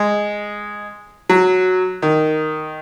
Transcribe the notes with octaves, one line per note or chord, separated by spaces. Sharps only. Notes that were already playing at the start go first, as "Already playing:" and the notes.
Already playing: G#3
F#3
D#3